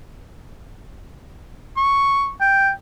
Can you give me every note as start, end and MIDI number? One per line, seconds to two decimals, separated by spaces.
1.77 2.31 85
2.41 2.70 79